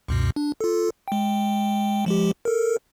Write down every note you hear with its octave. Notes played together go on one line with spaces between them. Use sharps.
C#2 F#2 B2
D4
F4 A4
G#3 G5
F3 G#3 G4
A4 A#4